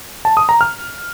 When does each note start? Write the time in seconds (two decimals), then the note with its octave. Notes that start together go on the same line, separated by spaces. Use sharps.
0.25 A5
0.37 D#6
0.49 A#5
0.61 F6